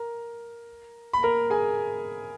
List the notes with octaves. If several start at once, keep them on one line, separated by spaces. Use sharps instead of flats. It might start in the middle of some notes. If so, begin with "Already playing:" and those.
Already playing: A#4 A#5
B5
A#4 A#5
G#4 G#5